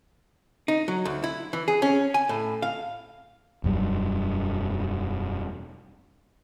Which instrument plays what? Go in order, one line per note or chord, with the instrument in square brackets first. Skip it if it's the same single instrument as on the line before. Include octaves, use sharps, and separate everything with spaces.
[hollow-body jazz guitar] D#4
F#3
D2
E4
E3
G#4
C#4
G#5
A2
F5
[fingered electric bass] E1 F#2 G3